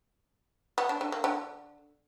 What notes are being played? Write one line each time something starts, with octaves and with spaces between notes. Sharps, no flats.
B3
D4
D3
A#3
D3